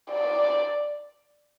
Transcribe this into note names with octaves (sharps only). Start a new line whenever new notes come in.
D5